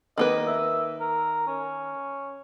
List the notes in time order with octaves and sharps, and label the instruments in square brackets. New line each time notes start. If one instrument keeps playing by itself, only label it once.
[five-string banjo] D#3 A#3 B4 [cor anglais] D#5
[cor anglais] E5
A#4
C#4